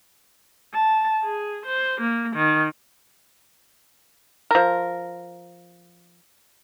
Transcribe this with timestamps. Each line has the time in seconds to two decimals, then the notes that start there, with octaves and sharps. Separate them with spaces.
0.74 A5
1.24 G#4
1.66 C5
2.00 A#3
2.36 D#3
4.51 F3 A#4